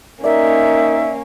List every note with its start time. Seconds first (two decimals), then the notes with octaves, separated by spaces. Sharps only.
0.24 A#3 C#4 D#4 A#4 D5 E5